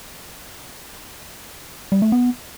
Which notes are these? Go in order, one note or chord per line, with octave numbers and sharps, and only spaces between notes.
G3
A3
B3